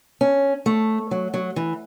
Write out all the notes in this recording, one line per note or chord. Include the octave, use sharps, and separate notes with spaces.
C#4
A3
F#3
F#3
E3